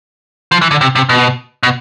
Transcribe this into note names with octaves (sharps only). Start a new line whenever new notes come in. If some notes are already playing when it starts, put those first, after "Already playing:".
F3
E3
D3
C3
C3
B2
B2